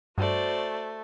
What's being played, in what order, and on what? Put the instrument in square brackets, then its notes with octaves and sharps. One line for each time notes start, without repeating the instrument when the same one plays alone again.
[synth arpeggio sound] G2 [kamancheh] A3 [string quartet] F#4 C5 D5